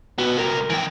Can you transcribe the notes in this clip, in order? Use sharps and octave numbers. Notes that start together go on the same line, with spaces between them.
B3 F#4
C#2 A#4
E3 G5